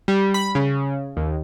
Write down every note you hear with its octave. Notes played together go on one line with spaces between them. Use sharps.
G3
B5
C#3
D#2